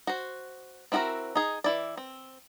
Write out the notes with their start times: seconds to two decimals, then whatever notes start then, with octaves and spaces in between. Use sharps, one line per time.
0.07 F#4 C5
0.92 C4 E4 F#4 G#4 A#4
1.35 D#4 G#4
1.64 E3 E4 D5
1.97 C4